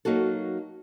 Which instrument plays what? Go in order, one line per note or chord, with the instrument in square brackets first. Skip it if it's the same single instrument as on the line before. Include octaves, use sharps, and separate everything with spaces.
[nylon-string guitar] F#3 A#3 D#4 F#4 A4